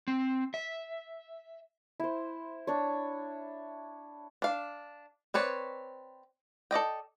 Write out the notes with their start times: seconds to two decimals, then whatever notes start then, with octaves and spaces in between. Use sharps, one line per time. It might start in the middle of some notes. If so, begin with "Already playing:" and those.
0.08 C4
0.54 E5
2.00 E4 C5
2.67 D4 C#5
4.42 D4 F5
5.34 C4 B4 C#5 D5
6.71 A4 D5 D#5 G5